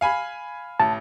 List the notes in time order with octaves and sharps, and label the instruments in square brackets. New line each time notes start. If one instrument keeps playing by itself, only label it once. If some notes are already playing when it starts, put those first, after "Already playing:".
[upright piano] F5 G#5 B5
[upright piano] A1 [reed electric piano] A5